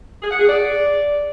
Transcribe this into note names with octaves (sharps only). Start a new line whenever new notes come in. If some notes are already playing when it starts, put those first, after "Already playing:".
G#4
F#5
G#4
D5